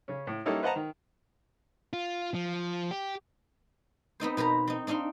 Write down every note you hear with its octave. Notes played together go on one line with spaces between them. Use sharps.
C#3 C#4
A2
G3 A#3 C#4 D#4 E4 A4
B4 C5 D#5 F#5 A5 A#5
D#3
F4
F3
G4
B3 C4 D#4 C5
B2 B4 C5 A#5
C4 D#4
C4 D4 D#4 F5 C6